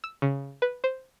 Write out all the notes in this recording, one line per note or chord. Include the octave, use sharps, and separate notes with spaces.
E6
C#3
B4
C5